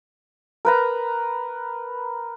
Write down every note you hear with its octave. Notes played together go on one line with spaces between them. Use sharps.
A#4 B4 A#5